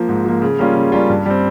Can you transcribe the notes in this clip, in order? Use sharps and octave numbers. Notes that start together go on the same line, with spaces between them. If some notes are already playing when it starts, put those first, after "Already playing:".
Already playing: F3 A#3
G#2
F3 A#3
C#3
G3 A#3 C#4 F4
C#3
G3 A#3 C#4 F4
G2
G3 C4